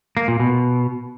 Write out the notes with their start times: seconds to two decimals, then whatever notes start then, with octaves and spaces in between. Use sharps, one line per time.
0.17 A#3
0.28 A#2
0.39 B2